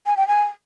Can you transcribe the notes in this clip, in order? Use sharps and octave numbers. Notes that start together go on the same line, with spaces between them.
G#5
G5
G#5